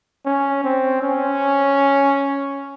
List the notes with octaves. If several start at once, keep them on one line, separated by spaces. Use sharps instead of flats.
C#4
C4
C#4